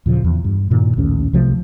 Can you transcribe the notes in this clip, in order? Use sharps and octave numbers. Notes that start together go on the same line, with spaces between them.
D#2 A#2 C#3 F3
E2
G2
G2 A#2 D#3
A#1 D#2 A2 C#4
C2 C3 F3 A3